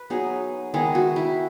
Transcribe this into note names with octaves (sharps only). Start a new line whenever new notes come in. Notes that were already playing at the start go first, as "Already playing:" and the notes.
Already playing: B4
F#3 B3 D#4 G#4
D#3 G#3 B3 E4 G#4
F#4
E4